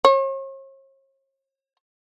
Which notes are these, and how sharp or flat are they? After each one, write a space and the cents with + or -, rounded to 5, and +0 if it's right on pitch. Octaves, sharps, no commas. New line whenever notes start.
C#5 -45